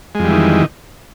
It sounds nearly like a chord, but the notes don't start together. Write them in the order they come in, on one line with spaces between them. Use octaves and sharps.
G#3 F2 G3 E3 D#3